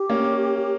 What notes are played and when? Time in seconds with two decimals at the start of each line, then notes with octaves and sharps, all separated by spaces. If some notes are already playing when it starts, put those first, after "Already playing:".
Already playing: G4
0.10 A#3 C#4